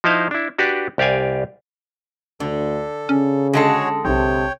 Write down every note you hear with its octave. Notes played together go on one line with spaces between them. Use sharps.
F3 D#4 E4 C5 D#5 F5
D4 E4
D4 F#4 G4 B4 D5
C2 G4 D5 F5 G#5
D2 D3 A4
C#3 C#4
D3 G#3 F#4 G#4 A4 C#5
B1 C3 C#5 G5